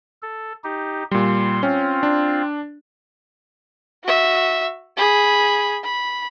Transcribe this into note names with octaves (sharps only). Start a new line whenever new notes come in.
A4
D#4 G4
A#2 G3 C6
C4 C#4 F4
D4
F#4 E5
G#4 B5
B5